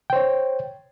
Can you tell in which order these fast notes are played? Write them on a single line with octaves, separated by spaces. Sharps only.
G5 C5 C#5